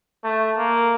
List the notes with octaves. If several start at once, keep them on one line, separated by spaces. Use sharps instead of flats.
A3
A#3